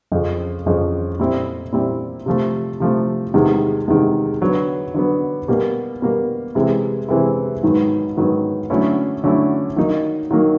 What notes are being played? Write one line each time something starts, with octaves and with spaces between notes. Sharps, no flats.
F2 C#3 F3
F2 C#3 F3
A#2 G3 C4 E4
A#2 G3 C4 E4
C3 F3 A3
C3 F3 A3
E2 C3 D#3 G#3
E2 C3 D#3 G#3
D3 F#3 B3
D3 F#3 B3
B2 G3 A#3
B2 G3 A#3
C3 E3 G#3 C4 E4
C3 E3 G#3 C4 E4
G#2 D#3 F#3 B3
G#2 D#3 F#3 B3
D3 F#3 A3 C#4 E4
D3 F#3 A3 C#4 E4
D#3 F#3 A#3 D#4
D#3 F#3 A#3 D#4